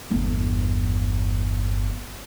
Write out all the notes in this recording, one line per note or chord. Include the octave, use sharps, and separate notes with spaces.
G1 E2